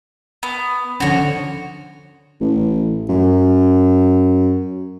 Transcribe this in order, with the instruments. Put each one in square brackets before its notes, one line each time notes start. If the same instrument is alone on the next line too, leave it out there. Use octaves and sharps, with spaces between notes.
[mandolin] B3
[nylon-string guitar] D3 F3 C#4 [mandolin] F#4 C#5
[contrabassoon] A1
F#2